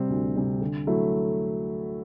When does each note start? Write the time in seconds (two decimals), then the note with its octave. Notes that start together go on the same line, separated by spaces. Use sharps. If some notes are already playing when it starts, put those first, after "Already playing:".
Already playing: C3 G3 C4
0.09 D2
0.35 C3 G3 C4
0.61 D3
0.87 F#3 A3 E4